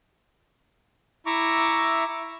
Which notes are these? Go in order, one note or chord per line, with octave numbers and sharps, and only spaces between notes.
E4 E5 A#5 C#6 D6